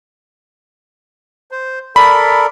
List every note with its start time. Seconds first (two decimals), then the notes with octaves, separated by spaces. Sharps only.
1.51 C5
1.96 A4 A#4 D5 B5